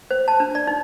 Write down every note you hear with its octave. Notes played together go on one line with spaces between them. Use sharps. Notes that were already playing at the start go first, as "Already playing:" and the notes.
C5
A5
D4
D5
D#4